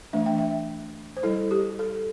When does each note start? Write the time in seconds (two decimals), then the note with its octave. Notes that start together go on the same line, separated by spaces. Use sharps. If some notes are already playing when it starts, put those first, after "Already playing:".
0.13 E3 A3 D4 E5
0.26 G5
0.38 E5
1.17 C5
1.23 G3 E4 A4
1.51 G4
1.79 A4